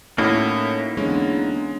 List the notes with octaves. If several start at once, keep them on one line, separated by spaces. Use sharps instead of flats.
A2 A#3 C#4 D#4 E4 F#4 A4
E2 D3 G#3 C#4